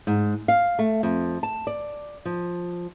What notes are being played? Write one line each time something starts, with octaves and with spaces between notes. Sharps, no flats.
G#2
F5
A3
F2
A5
D5
F3